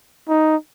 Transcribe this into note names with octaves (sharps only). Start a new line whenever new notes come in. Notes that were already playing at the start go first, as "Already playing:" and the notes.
D#4